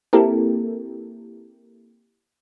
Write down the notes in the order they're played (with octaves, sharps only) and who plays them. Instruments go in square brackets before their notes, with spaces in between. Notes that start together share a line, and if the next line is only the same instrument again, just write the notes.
[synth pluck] A#3 C4 E4 G4 A4 A#4